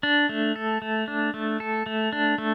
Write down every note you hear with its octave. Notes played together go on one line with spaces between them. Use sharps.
D4
A3
A4
A3
D4
A3
A4
A3
D4
A3